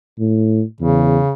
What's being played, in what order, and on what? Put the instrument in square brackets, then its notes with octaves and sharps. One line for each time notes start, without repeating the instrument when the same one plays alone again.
[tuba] A2
[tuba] E2 [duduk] C#3